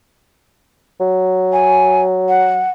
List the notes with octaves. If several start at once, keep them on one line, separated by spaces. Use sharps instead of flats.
F#3
G#5
F#5